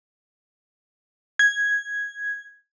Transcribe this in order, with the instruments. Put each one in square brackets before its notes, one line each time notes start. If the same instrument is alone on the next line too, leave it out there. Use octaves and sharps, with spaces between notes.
[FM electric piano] G#6